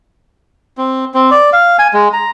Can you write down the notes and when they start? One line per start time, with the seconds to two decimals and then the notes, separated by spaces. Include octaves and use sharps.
0.77 C4
1.14 C4
1.31 D5
1.53 F5
1.79 G#5
1.93 G#3
2.13 A#5